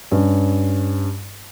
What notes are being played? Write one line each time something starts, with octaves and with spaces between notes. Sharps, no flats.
G2 C#4